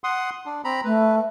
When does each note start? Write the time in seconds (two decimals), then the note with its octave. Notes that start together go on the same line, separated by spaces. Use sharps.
0.04 F#5 C6 D#6
0.46 D4
0.64 C4 A#5 B5
0.84 A3 B4